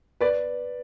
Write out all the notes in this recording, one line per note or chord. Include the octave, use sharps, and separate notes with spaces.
B4 D5